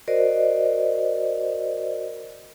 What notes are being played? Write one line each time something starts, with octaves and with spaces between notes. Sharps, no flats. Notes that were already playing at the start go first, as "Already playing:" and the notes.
F#4 A#4 C5 D5 D#5